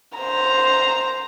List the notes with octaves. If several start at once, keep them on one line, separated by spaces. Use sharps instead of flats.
C5 A#5